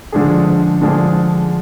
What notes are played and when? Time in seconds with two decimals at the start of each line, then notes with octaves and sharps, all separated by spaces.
0.12 D3 F3 G#3 D4 G#4
0.81 D3 F3 G#3 D4 G#4